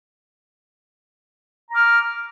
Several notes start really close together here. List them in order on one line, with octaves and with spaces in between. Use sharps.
A#5 D6 F6